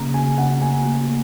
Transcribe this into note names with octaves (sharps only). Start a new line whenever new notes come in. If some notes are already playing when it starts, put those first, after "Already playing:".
Already playing: C#3 A#3 A#5
C#3 G#5
C#3 F#5
A#3 G#5
A#3
A#3